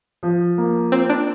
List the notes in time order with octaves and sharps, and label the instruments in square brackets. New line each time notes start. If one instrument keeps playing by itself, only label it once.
[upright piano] F3
A#3
[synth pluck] C4 [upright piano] F4
[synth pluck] D4